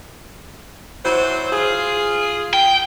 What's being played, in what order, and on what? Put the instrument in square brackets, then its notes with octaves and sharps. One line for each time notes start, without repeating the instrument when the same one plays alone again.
[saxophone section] E3 F#3 C5
F4 G#4
[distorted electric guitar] G5